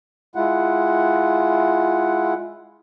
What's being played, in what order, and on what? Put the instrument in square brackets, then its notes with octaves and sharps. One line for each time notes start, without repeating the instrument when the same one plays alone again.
[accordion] G#3 E4 F4 F#5